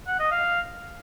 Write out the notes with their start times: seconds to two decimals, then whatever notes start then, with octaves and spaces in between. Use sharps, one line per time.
0.08 F#5
0.19 D#5
0.31 F5